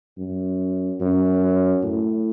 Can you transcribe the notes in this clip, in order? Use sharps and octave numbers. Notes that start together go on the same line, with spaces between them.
F#2
F#2
A2